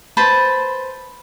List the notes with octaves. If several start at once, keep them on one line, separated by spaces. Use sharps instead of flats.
B4 C5 A5 B5